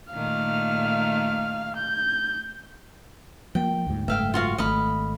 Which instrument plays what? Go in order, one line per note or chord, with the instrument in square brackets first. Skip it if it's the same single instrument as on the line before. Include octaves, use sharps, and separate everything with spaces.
[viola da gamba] A#2 D#3 A3 [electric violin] F5
[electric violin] G6
[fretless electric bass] F3 A#3 [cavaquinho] G5
[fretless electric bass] D2 G#2
[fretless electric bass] F#1 G#2 A3 [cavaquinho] E5 F5 G5
[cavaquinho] F4 F#4 F5
[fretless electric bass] G#1 A3 [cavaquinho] D#5 F5 B5